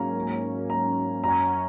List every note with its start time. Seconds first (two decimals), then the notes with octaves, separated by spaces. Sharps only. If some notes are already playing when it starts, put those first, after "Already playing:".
Already playing: G#2 F#3 A#3 C#4 A#5
0.70 A#5
1.24 F#2 F#3 C#4 A#5